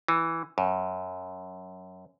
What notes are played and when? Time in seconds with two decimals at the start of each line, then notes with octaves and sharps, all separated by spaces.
0.08 E3
0.58 F#2